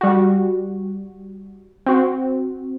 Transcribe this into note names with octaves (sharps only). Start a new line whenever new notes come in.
G3 F#4
C4 F#4